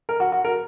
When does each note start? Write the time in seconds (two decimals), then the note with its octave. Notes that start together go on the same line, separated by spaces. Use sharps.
0.09 A#4
0.20 F#4
0.32 F#4
0.45 A#4